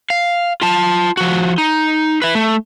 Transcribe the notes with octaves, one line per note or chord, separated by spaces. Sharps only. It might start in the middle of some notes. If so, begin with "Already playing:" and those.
F5
F4 A5
F3 F#4
D#4
B4 E5
A3